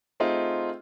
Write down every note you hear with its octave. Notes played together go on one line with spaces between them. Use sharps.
A3 C4 D#4 F4 G#4